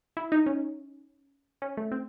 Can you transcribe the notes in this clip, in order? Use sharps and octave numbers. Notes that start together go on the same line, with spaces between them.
E4
D#4
C#4
C#4
A3
C4